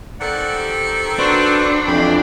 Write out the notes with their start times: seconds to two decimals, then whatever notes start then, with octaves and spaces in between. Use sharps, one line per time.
0.20 D#3 C4 A4 D5 F#5
0.59 G4
1.19 D4 F#4 B4 C5
1.87 F2 C3 E3 G5 B5